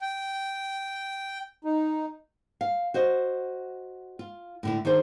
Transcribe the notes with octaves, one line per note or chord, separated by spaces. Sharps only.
G5
D#4
F5
F#4 C5 D#5
F4
A2 D3 E4
D#3 D4 G#4 C5